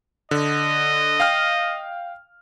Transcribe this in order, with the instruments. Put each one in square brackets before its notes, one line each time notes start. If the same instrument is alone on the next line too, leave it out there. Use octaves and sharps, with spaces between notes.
[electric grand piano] D3 [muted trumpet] D#5
[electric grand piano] F5 G5 F6